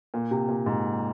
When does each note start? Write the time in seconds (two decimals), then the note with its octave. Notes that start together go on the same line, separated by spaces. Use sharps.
0.14 A#2
0.31 C3
0.48 A#2
0.66 G#2